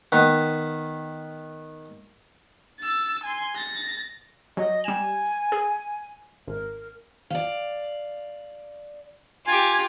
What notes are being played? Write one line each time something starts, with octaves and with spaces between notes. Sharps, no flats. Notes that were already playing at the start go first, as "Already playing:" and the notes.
D#3 B3
E6 A6
G#5 C6
A6 A#6
F#3 D#5
G3 G#5 E7
G#4
G#1 A#4
D5 F5
F4 G4 G#5